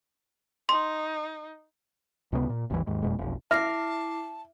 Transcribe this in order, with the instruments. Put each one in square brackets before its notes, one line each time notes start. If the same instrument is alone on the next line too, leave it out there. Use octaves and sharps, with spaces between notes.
[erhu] D#4 [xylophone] C6
[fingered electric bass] C#2 C3 G#3 B3
A#2
G#1 D#2 E3
D#2 G#2
F#1 F2 B2 G#3
F1 B1
[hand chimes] E4 D6 C7 [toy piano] E5 [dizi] A5 [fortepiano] F6